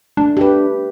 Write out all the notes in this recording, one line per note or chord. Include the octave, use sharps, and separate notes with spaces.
A3 D4
G4 B4